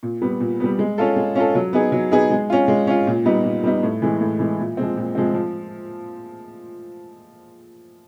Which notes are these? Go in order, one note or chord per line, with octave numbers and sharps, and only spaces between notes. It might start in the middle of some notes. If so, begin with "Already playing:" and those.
A#2
G3 B3
A#2
G3 B3
G#3
C#4 F4 A4
G#3
C#4 F4 A4
F#3
B3 D#4 G#4
F#3
B3 D#4 G#4
G#3
C#4 F4
G#3
C#4 F4
A#2
G3 B3 D#4
A#2
G3 B3 D#4
A2
E3 G#3
A2
E3 G#3
A#2
F3 G#3 C4
A#2
F3 G#3 C4
F3